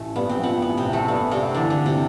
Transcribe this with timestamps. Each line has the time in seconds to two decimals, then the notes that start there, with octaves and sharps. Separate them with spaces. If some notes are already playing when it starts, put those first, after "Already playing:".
Already playing: A1 A3
0.16 G2 B3
0.29 C4
0.39 F3 B3
0.62 A1 B3
0.78 C3 C4
0.85 A1
0.93 A3
1.08 G2 B3
1.31 G2 C3 C4
1.55 D3 E3 D4
1.70 D3 D4
1.78 E3
1.86 C3 C4